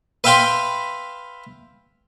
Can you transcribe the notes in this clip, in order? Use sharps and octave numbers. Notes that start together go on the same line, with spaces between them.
B4 E5 F5 G5 B5 C6